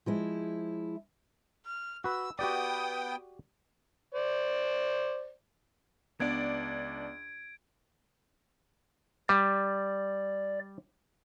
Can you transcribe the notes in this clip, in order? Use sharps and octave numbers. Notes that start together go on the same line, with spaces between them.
F3 G#3 E4
F6
F#4 B4 E6
B3 F#4 G4 D5 G5 D#6
C5 D5
C#2 B3 D4 D5 G#6 D7
G3 D5